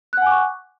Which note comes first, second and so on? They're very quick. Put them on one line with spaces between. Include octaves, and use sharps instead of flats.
F#6 F#5 G#5 D6 C#6